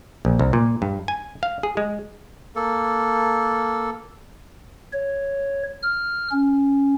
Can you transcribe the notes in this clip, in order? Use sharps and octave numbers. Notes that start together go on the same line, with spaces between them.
A#1
C2
A#2
G2
G#5
F5
G#4
G#3
A#3 A4
C#5
F6
C#4